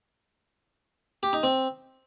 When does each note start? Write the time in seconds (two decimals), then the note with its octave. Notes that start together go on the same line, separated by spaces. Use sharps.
1.23 G4
1.33 D#4
1.43 C4